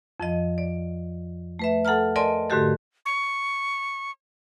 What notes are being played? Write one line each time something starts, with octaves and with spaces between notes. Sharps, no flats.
F2 F3 D#5
D5
A3 B4 E5
A4 F#5 A5 A#5 F6
A#4 D5 D#5 G#5 A5 C6
G#2 D3 A3 F#4 G4 A4
C#6